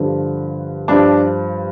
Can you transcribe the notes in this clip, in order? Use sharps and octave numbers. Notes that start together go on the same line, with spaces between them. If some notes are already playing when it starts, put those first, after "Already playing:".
Already playing: G2 D3 F3
G2 F3 D4